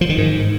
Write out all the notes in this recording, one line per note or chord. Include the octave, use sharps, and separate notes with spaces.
F3
D#3
G#2